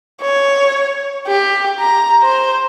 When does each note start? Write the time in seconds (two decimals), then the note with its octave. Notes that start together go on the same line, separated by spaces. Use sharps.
0.22 C#5
1.27 G4
1.79 A#5
2.23 C5